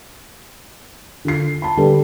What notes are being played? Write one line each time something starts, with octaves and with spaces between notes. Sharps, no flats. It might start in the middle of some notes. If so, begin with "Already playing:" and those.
D3 F4 C7
A5 B5
D3 G3 D4 A4 B4